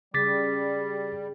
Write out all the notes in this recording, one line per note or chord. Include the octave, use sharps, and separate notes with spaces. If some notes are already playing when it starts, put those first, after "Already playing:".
C#3 G3 G#4 D6 A6 B6